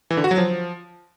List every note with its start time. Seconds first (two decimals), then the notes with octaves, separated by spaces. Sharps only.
0.11 E3
0.17 D3
0.24 F#4
0.31 F#3
0.38 F3